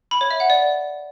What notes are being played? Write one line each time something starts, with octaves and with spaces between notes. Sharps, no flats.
B5
C#5
E5
F#5
D5